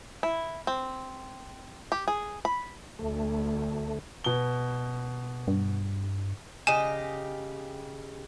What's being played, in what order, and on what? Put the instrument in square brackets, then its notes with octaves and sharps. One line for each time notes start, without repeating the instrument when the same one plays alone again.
[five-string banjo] E4
C4
G4
G#4
B5
[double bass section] D2 [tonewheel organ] A3
[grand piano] B2 G7
[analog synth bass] G2
[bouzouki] C#3 G4 D#5 [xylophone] G#5 E7